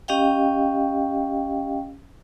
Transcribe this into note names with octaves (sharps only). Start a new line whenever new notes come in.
C#4 G4 D#5 F5 G5